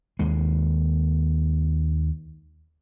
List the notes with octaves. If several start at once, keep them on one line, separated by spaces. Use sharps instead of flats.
D#2 G#3